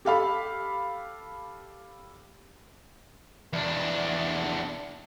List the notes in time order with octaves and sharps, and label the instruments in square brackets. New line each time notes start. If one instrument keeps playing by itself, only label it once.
[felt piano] G4 A4 F5 B5
[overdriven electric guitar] E2 D4